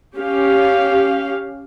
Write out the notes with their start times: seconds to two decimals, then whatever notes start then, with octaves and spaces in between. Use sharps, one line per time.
0.15 C#4 G4 F5